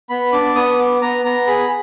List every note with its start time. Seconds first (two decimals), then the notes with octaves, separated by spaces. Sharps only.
0.09 B3 B5
0.32 D4 D6
0.55 B3 D#6
0.79 B3 D6
1.02 B3 A#5
1.25 B3 A#5
1.47 G#4 B5